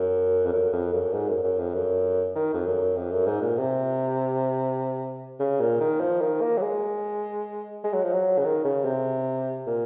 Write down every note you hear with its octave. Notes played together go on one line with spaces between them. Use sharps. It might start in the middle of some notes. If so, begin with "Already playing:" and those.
Already playing: F#2
F2
F#2
F2
F#2
G#2
F#2
F#2
F2
F#2
D#3
F2
F#2
F2
F#2
G#2
A#2
C3
C#3
A#2
D#3
F3
D#3
A#3
F#3
G#3
G#3
F#3
F3
F#3
C#3
D#3
C#3
C3
A#2